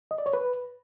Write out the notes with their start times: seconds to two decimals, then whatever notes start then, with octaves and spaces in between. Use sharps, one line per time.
0.11 D#5
0.18 D5
0.26 C#5
0.33 B4